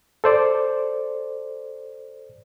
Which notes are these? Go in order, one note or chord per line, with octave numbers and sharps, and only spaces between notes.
A4 C5 D5